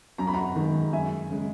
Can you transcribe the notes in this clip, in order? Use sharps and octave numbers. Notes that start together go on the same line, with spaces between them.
F#2 A#5
B5
F#5 A#5
D#3 G#3
F#2 E5 G#5
C#3 G#3